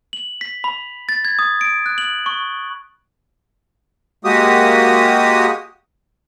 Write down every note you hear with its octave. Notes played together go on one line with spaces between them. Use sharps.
F#7
B6
B5
A6
G#6
D#6
D7
F#6
F#7
C#6
G#3 A#3 F#4 G4 D#6